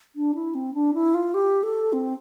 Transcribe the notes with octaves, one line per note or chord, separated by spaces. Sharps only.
D4
E4
C4
D4
E4
F4
G4
A4
C4